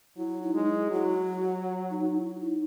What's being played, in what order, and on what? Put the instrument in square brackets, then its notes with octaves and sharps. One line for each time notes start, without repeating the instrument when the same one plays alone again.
[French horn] F#3 [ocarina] E4
[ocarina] D#4
[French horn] G#3
[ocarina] E4
[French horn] F#3 [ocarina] F#4
[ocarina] D#4
D#4
E4
E4
D#4